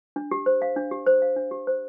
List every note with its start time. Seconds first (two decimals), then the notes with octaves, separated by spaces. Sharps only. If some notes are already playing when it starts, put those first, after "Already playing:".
0.16 D4
0.31 G4
0.46 C5
0.62 F5
0.76 D4
0.91 G4
1.06 C5
1.22 F5
1.36 D4
1.51 G4
1.67 C5